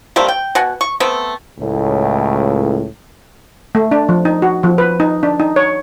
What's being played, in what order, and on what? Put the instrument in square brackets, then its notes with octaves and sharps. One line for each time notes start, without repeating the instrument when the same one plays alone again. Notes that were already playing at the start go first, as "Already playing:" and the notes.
[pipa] G3 A3 A#3 C4
G5
B2 F#5 G#5
C#6
A3 B3 C4
[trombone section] C#2 A2
[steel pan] A3
D4
F3
D#4
F#4
F3
B4
D#4
D4
D#4
C#5